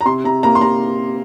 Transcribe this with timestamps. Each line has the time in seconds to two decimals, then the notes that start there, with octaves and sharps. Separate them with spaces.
0.01 A#5
0.06 C3 C6
0.24 C3 A#5
0.43 A#3 A#5
0.55 C6
0.61 C3 A#5